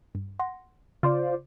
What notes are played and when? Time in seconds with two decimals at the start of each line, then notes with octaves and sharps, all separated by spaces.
0.15 G2
0.40 F#5 C6 A#6
1.03 C#3 F4 C5 D5